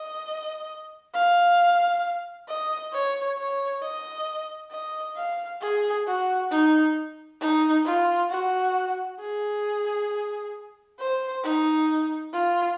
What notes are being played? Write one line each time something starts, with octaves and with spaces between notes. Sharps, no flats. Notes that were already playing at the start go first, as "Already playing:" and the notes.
Already playing: D#5
F5
D#5
C#5
C#5
D#5
D#5
F5
G#4
F#4
D#4
D#4
F4
F#4
G#4
C5
D#4
F4